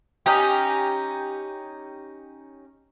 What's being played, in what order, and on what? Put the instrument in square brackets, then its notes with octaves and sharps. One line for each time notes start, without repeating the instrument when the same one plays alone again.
[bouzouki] C#4 D#4 G4